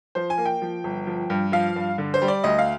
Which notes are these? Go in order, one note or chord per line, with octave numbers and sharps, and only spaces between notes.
F3 C5
G#5
A#3
G5
F3
G1
F3
G2
F3 F5
G2
D3
C5
G3
D5
D2 D#5
F5